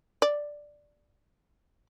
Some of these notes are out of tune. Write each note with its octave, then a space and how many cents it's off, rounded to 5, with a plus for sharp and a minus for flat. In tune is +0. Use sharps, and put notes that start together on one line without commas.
D5 +5